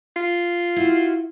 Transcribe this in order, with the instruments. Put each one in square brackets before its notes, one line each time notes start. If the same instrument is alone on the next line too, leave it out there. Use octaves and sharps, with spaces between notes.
[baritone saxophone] F4
[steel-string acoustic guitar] E4 F#4